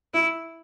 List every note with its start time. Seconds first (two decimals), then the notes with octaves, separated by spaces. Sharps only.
0.14 E4